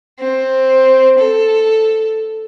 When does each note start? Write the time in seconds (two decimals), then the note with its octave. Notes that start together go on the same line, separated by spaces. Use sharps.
0.19 C4
1.18 A4